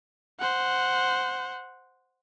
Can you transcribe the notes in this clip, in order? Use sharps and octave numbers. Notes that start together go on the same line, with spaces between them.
C5 F#5